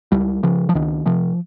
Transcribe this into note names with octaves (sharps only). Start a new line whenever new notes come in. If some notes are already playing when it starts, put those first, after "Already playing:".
C#2 G3
C#3 F3
F3
C#2 D#3
C3 F3